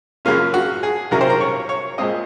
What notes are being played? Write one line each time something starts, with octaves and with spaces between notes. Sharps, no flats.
F#2 C#3 F#3 A#3 C#4 F4
F#4
G#4
C2 C3 D#3 F#3 C#4 A#4
C5
A#4
C#5
C#5
A#2 G#3 C4 D#5